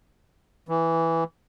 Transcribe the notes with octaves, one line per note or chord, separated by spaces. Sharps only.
E3